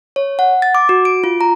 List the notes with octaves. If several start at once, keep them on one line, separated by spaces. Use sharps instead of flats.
C#5
F#5
A6
D6
F#4
D7
F4
A#5